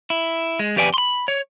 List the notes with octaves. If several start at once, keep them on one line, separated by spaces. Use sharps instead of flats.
E4
G#3
F2 G4 B4 D5 G#5
B5 C6
C#5